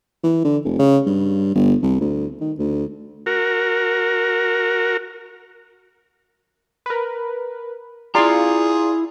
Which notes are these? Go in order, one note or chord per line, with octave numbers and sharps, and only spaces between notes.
E3
D3
F1
C#3
G2
G1
C2
D2
D#3
D2
F#4 A#4
A#4 B4
E4 F4 G#4 D5 A#5 C6